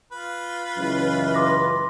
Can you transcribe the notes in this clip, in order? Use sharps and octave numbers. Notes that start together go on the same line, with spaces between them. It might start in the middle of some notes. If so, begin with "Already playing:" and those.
F4 B4
C#2 F#2 E3
C6 D6 A#6